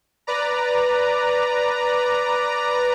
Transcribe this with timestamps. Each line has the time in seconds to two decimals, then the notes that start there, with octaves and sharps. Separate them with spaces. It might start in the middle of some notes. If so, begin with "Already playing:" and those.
0.27 B4 D5 A#5